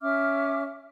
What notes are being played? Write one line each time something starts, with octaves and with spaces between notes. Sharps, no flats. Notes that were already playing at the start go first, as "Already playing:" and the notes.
C#4 E5 D6 F6